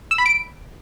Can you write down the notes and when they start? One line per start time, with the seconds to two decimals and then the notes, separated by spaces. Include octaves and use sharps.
0.11 E6
0.18 B5
0.26 D7